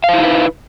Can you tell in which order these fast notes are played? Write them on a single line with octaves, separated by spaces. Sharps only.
F5 C5 E4 D#4 B4